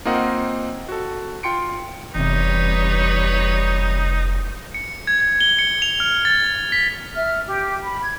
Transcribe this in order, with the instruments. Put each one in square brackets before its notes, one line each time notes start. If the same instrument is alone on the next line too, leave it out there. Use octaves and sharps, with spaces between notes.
[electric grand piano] A#3 C4 D#4 F4 D#5 F#5
F#4 A4
F4 G5 C6 C#7 D7
[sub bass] F1 [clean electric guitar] E2 C3 [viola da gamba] G3 B4 C#5 [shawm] D#4
[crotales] C#7
G#6
G#6
G7
C#7
F7
F6
A6
B6
[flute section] E5 F6
G4
B5
G#6